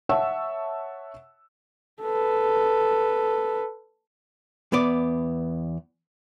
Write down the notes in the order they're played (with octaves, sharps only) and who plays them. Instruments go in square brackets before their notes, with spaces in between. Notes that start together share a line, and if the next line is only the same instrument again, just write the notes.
[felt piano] C#5 E5 F#5 A5 C#6 E6
[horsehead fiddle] A4 B4
[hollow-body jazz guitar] E2 B3 D5